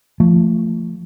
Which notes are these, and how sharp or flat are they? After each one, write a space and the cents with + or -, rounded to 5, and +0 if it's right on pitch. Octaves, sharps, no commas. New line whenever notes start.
F3 -20 A3 +20